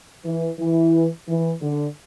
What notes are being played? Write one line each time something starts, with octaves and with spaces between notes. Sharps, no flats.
E3
E3
E3
D3